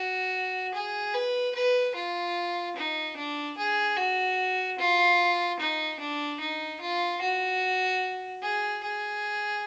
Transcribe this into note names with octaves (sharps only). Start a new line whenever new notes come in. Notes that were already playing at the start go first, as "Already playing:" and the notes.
Already playing: F#4
G#4
B4
B4
F4
D#4
D4
G#4
F#4
F4
D#4
D4
D#4
F4
F#4
G#4
G#4